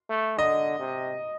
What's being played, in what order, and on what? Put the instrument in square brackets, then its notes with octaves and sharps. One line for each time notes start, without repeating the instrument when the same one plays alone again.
[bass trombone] A3
[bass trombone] D3 [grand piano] D#5
[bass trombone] C3